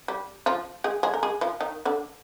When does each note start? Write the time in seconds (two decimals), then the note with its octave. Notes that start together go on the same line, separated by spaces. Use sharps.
0.08 G3
0.46 F3 F4
0.84 G#3 G#4
1.03 G#3 G#4
1.14 A#4
1.23 G#3 G#4
1.41 F3 F4
1.61 D#3 D#4
1.85 D3 D4